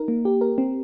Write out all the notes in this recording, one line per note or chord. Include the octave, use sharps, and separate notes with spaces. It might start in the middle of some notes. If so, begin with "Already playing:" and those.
Already playing: D#4 A#4
A#3
G4
A#4
C4